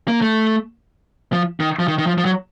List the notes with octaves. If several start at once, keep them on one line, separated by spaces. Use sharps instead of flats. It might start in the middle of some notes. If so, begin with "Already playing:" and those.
A#3
A3
F3
D#3
F3
D#3
D#3
F3
F3
F#3